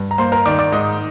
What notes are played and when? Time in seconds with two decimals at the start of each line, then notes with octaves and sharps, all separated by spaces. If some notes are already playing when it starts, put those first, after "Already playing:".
Already playing: G2
0.11 A#5
0.18 A#3 C5 C6
0.32 A#4 A#5
0.46 D#3 D5 D6
0.59 D5 D6
0.72 G#2 D#4 D#5